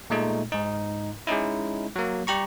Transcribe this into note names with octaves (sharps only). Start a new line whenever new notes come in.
A#2 G#3 A3 D#4
G#2 D#4
G#3 C#4 D#4 E4
F#3 A#3
G3 G4 A#5 C#6